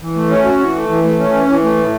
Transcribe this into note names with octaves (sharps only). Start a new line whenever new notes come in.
E3
A3
C#4
F#4
E3
A3
E3
A3
C#4
E3
E3
A3
A2